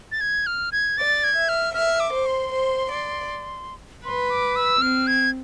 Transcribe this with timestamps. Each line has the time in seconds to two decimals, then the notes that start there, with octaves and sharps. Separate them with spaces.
0.12 A6
0.21 G#6
0.47 F6
0.72 G#6
0.97 D5 A6
1.24 G#6
1.35 E5
1.49 F6
1.74 E5 F6
2.00 D6
2.13 C5
2.26 C6
2.52 C5
2.90 D5
4.05 B4 C6
4.30 D6
4.56 E6
4.81 C4 F6
5.07 G#6